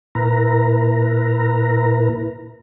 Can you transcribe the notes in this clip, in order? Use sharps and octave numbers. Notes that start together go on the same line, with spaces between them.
A#2 E4 A#4 B4 A#5